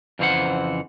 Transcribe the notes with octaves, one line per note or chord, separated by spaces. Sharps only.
F2 C#3 E3 C5 F#5